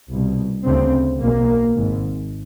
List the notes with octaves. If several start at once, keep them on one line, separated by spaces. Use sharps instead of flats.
C2 B2
D2 C#3 C4
B1 B2 A#3
G#1 G#2